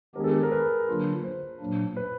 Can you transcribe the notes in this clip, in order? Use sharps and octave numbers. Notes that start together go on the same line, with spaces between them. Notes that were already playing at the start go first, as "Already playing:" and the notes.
D#3 G#3 B3 D4 G4 G#4 A#4
A4
G#4
A#4
B4
D3 F#3 A#3 D4 F4
C5
A#2 F#3 A#3 D4
B4